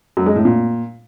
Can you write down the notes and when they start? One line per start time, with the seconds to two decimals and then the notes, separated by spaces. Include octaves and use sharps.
0.17 F#2
0.26 G#3
0.36 A2
0.45 A#2